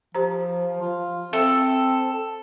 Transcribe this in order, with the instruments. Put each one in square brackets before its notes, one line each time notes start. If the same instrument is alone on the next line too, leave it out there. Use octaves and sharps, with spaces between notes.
[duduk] F3 [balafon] G4 C5 A#5
[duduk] F4
[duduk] C4 [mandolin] A4 [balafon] E5